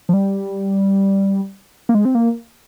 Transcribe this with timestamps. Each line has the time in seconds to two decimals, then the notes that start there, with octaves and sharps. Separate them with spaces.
0.09 F3
0.13 G3
1.89 A#3
1.95 G#3
2.05 C4
2.15 A#3